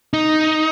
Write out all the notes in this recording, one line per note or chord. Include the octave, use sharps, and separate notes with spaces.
D#4